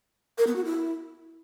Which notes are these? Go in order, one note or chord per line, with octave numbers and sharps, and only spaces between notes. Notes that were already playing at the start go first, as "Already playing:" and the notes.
A#4
B3
F#4
E4